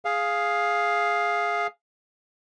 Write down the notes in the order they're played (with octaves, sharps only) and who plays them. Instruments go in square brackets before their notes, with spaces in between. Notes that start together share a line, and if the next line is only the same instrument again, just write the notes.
[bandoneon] G#4 F5